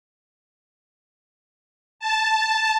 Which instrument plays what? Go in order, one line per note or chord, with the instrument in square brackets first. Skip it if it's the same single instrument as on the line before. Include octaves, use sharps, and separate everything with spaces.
[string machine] A5